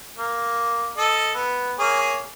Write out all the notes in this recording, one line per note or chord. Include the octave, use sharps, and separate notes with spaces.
A#3
A4 D#5
B3
A#3 G#4 C#5